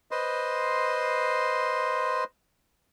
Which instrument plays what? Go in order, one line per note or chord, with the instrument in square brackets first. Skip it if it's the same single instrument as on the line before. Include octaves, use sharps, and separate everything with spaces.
[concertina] B4 C5 D#5 C6